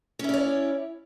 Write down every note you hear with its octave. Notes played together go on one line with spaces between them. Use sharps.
C#4 E4 C#5 D5